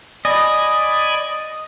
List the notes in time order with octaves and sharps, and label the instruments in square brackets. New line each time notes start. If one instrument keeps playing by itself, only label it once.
[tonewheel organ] D5 G#5 B5 [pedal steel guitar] D#5